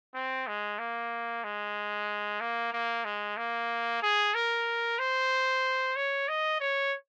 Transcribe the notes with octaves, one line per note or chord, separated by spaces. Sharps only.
C4
G#3
A#3
G#3
A#3
A#3
G#3
A#3
G#4
A#4
C5
C#5
D#5
C#5